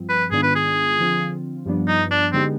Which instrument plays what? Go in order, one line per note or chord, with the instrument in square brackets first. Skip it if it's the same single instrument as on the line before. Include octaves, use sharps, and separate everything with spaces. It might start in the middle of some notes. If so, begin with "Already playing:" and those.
Already playing: [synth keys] G2 F3 C4
[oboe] B4
[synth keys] G#2 D#3 B3 D4 F4 [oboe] G#4
[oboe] B4
G#4
[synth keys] D3 F3 C4 F4
G2 F3 B3 D4
[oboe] D#4
D4
[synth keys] D3 G#3 B3 D#4 G4 [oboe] C4